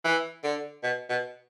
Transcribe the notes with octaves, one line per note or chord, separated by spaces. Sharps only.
E3
D3
B2
B2